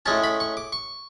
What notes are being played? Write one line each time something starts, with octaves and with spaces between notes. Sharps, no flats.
A2 G#3 C#4 A5
B5
C#6
D6
C#6